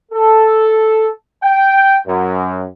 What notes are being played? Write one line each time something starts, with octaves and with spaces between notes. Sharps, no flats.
A4
G5
F#2